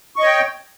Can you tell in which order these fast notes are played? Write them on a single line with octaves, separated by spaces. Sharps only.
C#6 D#5 C#5 G5